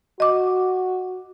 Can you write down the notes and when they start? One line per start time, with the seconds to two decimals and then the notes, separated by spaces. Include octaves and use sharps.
0.20 F#4 D#5 D6